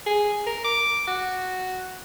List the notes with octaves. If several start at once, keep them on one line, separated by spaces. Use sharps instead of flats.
G#4
A#4
D6
F#4